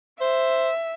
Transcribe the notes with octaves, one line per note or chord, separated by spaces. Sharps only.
C5 E5